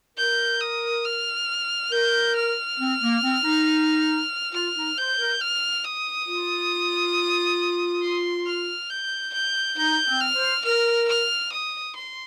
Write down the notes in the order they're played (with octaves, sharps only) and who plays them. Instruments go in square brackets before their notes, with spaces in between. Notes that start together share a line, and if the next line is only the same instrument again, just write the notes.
[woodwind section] A#4 [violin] G6
[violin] D#6
F6
[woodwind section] A#4 [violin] G6
[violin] F6
[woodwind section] C4
A#3
C4
D#4
[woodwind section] F4 [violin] F6
[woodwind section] D#4
[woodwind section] C5 [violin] G6
[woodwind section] A#4
[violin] F6
D#6
[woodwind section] F4
[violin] C6
F6
G6
G6
[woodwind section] D#4 [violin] G6
[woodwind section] C4
[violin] F6
[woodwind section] C5
[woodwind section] A#4 [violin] F6
[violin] F6
D#6
C6